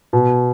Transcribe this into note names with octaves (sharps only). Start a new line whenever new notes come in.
B2